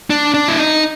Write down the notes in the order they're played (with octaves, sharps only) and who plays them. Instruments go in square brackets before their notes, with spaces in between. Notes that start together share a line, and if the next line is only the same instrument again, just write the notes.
[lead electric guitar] D4
D4
E4
D#4